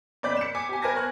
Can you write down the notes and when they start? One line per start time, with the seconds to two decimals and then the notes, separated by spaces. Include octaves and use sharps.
0.23 F#1 D5 G6 B6
0.37 C#7 E7
0.55 G#5 D6 B6
0.69 G4 G#5
0.82 A#4 B4 G#5 A5 G#6 A#6
0.95 C5 G#5 C#6 F6 F#6